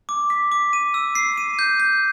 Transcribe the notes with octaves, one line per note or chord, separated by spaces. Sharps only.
D6
B6
D6
D#7
E6
C7
D#7
G6
G6